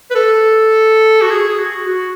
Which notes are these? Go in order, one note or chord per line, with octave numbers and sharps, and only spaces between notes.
B4
A4
F#4
G#4
G#4
F#4
F#4